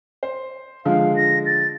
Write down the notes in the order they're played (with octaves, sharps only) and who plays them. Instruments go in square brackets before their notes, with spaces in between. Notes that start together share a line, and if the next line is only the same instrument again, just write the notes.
[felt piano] C5
[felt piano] D3 F3 G#3 [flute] F5
[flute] A#6
A6